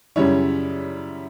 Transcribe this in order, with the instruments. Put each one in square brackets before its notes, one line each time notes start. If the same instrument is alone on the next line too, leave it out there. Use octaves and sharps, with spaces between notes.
[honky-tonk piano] F#2 C#3 G3 C#4 E4 C#5